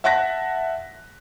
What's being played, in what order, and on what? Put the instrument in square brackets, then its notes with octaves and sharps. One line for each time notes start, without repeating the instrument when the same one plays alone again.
[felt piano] E5 F#5 A5 F#6 A#6 B6